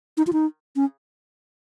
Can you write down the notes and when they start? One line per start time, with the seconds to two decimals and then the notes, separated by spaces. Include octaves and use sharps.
0.17 D#4
0.27 F4
0.33 D#4
0.76 C#4